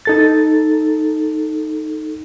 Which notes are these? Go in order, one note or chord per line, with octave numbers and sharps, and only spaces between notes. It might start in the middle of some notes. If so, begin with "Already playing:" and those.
D#4 A4 A6